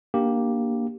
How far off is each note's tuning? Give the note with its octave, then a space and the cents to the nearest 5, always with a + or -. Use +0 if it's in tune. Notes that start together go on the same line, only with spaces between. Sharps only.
A#3 +10 D4 +0 G4 +0